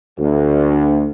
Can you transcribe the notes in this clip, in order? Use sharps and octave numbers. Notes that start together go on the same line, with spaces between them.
D2